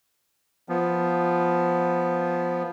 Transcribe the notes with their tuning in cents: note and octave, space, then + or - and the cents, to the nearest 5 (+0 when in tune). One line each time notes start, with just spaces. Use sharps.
F3 +0 B3 +0